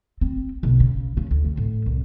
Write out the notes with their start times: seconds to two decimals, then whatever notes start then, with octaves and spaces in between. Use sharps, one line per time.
0.21 C4
0.63 B1
0.80 C#3
1.17 C#3
1.31 D2
1.44 C#3
1.57 A2
1.86 C2